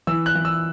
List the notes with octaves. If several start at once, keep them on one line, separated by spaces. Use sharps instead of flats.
E3 E6
F#6
E3
E6